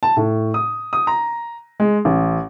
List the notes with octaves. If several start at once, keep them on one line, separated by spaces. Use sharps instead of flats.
A5
A2
D#6
D#6
A#5
G#3
A1